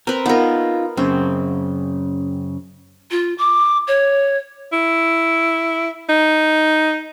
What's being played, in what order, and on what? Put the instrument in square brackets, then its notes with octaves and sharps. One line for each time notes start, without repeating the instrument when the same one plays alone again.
[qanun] C4 B4 [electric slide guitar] A#4
[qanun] B3 A#4 [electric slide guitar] D#4 F4
[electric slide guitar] F#2 C#3 [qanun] C4
[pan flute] F4
D6
C#5
[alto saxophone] E4
D#4